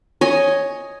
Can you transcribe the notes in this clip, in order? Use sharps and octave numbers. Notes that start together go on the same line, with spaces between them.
C#5 D#5 G#5